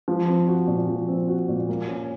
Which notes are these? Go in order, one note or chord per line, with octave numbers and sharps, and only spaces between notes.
F3
C4
F#4
A#2
F3
C4
F#4
A#2
A#3
C#4